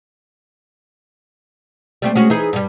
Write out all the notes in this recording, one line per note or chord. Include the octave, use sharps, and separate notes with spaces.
G3 A3 C4
G#3 C#4 F#4
E3 D#4 G#4
G2 G3